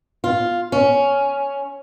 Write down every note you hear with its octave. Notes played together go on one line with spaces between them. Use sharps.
F4
C#4